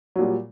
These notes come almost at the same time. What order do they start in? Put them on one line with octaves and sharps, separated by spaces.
F#3 A#2 G3